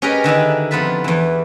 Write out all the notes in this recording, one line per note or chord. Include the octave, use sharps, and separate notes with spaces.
C#4 G4 G#4 A#4 B4 D#5
D3 D#3 D#4 E4
F2 B3 F4 B4 A5 B5
E2 E3